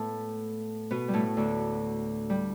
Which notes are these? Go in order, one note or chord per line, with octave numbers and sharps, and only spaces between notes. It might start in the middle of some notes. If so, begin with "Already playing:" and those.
Already playing: A2 A3 B3
B2 B3
G3
A2 A3
D2 D3
G3